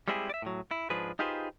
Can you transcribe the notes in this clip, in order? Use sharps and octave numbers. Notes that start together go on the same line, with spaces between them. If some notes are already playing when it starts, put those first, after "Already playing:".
G3 G#3 C4 E4 G4 G#4
D5 E5
A2 F#3
E4
G#2 F3 D4 G#4 B4
D#4 F4 G4 G#4 B4 C5